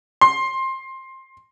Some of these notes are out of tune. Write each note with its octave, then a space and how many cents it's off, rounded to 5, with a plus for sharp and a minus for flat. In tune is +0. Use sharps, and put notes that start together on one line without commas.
C6 +20